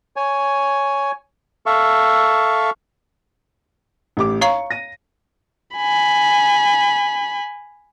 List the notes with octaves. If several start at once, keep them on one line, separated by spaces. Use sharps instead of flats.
C#5 G#5
A4 E5 F5 C#6
A1 G4 D6
C#5 F5 A#5 C#6
A#6 D#7
G#5 B5